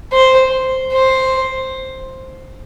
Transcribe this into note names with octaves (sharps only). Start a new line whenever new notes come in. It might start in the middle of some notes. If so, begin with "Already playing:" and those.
C5
C5